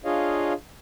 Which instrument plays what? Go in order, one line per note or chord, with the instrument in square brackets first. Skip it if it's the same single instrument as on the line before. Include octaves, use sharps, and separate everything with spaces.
[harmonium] D4 F4 G#4 C#5 D#5 F5